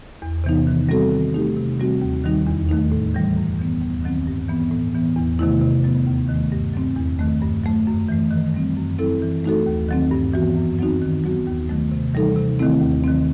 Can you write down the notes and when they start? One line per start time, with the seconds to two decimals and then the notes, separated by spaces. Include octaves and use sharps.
0.22 E2
0.44 C3 E3 B3 D#4
0.67 D#3
0.89 G3 C4 F#4 A4
1.11 D#3
1.34 A3 D#4 G4
1.56 C3
1.80 E3 G3 C4 F#4
2.02 D#2
2.24 D#3 G3 D#4
2.47 E2
2.69 D#3 A3 D#4
2.92 A2
3.14 E3 G3
3.37 F#2
3.59 E3 B3
3.81 D#2
4.04 D#3 F#3 C4
4.27 G2
4.49 E3 B3
4.71 A2
4.95 E3 B3
5.16 E2
5.39 C3 D#3 A3 E4
5.61 C3
5.84 F#3 B3
6.07 D#2
6.29 D#3
6.34 A3
6.52 G2
6.74 F#3 C4
6.96 E2
7.19 D#3 A3
7.42 G2
7.64 F#3 A3
7.87 F#2
8.09 E3 A3
8.31 D#3
8.54 G3 C4
8.77 F#2
8.99 F#3 C4 E4 A4
9.22 E3
9.44 A3 D#4 F#4 A4
9.66 D#2
9.89 D#3 F#3 C4
10.11 G2
10.34 E3 B3 F#4
10.56 F#2
10.79 F#3 C4 D#4 F#4
11.02 D#3
11.24 F#3 B3 F#4
11.47 D#2
11.69 D#3 F#3 A3
11.92 C3
12.14 E3 G3 D#4 A4
12.36 C3
12.59 D#3 A3 C4 E4
12.81 D#2
13.04 D#3 F#3 C4